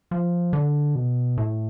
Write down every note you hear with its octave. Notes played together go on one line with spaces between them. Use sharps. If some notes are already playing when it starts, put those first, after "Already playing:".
F3
D3
B2
A2